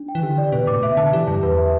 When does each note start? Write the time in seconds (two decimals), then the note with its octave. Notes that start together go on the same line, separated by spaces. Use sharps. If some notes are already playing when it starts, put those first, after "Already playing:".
Already playing: D4
0.08 G5
0.15 E3
0.23 D3 G4
0.38 D5
0.52 B2 B4
0.67 A2 D6
0.83 B2 E5
0.97 D3 A5
1.13 E3 G4
1.28 G2 A5
1.43 E2 B4
1.58 E5